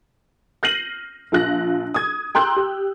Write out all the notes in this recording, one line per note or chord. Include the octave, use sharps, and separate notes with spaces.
F6 G6 A#6 C7 D#7 F#7
A#1 F4 F#6 A#6
D#6 G#6
G5 A#5 C6 E6 F#6 G6
G4